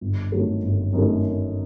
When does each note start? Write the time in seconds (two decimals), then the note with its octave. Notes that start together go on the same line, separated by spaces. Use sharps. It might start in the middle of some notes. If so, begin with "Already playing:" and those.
0.01 G1
0.32 F#2 D#3 F#3 A3
0.63 G1
0.93 F#2 D#3 F#3 A3